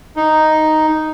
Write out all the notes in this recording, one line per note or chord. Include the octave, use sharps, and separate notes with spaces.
D#4